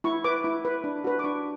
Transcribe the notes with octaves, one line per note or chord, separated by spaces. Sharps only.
E4 C#6
B4 D6
E4
B4
D4
F#4 B4
D6
D4 C#6